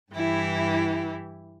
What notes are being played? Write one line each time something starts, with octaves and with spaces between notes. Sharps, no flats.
G2 E3 E4 G4